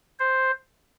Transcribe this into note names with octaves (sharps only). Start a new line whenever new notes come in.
C5